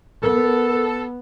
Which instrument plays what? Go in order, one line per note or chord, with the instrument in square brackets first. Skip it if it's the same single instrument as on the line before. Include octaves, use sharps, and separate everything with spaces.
[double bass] B3 [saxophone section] A4 [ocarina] A#4